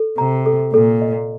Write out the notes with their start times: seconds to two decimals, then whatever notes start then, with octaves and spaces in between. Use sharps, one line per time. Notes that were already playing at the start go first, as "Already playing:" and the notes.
Already playing: A4
0.18 C3 A#5
0.46 A4
0.73 A#2 A4
1.02 D#5